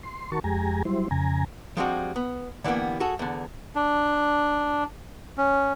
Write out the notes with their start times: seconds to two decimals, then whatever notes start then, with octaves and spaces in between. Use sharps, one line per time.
0.03 C6
0.32 D#3 F#4 A#4 A5 C#6
0.44 F2 G#3 G4 G#5 A#5
0.85 F#3 G3 E4 C5
1.11 F2 C#3 G#5 A#5
1.77 F3 G3 G#3 C4 D4 F#4
2.16 B3
2.64 D3 E3 G3 G#3 A#3 B3
3.00 F#4 G#4 A4
3.19 E2 D3
3.75 D4
5.38 C#4